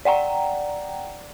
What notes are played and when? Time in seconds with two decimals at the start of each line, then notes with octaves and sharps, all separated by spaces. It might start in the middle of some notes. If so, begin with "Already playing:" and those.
0.05 D5 F#5 G5 A#5